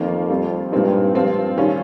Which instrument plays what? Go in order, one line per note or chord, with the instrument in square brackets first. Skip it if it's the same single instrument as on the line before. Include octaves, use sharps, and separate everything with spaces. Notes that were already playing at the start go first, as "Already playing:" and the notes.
Already playing: [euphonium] F2 [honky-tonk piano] D#3 A#3 F4
[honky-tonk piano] G3 C4 F4
[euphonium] G2 [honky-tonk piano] A#2 G#3 C4 D#4
[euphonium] G2 [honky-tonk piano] F3 C4 F4
[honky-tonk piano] D#3 G3 C#4 F4